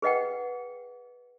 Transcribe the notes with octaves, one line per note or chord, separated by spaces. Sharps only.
G#4 B4 D#5 F#5 G5